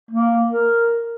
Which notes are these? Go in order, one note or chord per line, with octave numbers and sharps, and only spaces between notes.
A#3
A#4